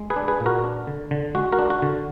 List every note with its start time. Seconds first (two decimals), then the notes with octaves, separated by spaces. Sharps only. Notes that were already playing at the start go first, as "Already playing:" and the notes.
Already playing: G#3
0.10 G#4 B4
0.16 D4
0.28 G#4 B4
0.40 A#2
0.46 F#4 A#4
0.64 D4
0.87 D3
1.11 D3
1.35 G#3 F#4
1.52 F#4 A#4
1.59 D4
1.70 F#4
1.82 D3